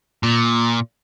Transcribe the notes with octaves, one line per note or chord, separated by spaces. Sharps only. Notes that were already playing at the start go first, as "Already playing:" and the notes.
A#2